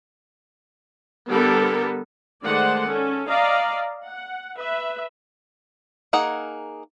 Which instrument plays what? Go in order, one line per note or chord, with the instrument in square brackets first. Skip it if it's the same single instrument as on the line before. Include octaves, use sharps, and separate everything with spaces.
[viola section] D3 G3 B3 A4 A#4
D#3 G#3 A3 C5 D5 F#5
C#4 A4
D5 D#5 F5 A#5
F#5
B4 E5
[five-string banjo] A#3 D#4 G#4 A#4 F#5